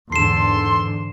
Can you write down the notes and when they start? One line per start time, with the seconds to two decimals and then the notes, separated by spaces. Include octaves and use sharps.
0.12 E2 G#2 D3 A4 C6 C7 E7